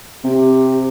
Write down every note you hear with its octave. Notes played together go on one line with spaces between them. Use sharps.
C3 G4